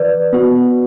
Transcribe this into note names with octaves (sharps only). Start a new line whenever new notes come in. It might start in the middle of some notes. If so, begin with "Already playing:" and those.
Already playing: E3 B4 D5
B3 F#4